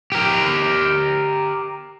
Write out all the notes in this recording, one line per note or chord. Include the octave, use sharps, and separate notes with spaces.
G4 A#4